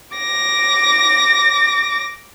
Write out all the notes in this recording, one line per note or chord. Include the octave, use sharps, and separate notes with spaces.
D6 A#6